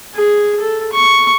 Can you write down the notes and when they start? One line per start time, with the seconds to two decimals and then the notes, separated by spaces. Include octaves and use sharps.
0.15 G#4
0.60 A4
0.93 C#6